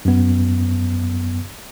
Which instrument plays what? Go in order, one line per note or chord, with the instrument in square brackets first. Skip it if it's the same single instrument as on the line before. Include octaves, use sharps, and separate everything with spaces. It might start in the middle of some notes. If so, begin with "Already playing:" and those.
[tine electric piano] F#2 B3